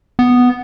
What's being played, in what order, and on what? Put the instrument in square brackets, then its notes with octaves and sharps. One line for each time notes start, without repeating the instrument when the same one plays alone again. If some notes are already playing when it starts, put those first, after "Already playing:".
[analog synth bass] B3